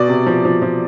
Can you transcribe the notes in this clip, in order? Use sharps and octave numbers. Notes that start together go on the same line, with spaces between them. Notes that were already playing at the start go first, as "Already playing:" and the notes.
Already playing: B2 D5
C3
F3
F3
F3